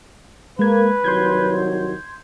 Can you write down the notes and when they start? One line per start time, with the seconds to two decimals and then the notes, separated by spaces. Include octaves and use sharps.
0.59 G#3 A#3 B4 G#6
1.04 C2 D#3 F#3 C6 G6 G#6